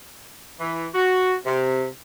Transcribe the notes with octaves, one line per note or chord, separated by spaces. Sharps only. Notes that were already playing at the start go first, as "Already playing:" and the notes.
E3
F#4
C3